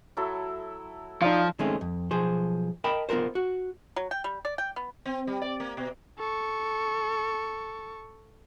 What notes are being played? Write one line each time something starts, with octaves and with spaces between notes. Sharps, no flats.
F#3 E4 A4
F3 D#4 D5 F5
D#3 G#3 A3 C4 C#4
F2
B1 F3 G#4 C5
A#4 D#5 G5 A5 B5
B3 F4 A4 A#4 C5
F#4
F#3
G5
G3
D5
G5
B3
C4
G3
D5
A#3
B2
A4 C#6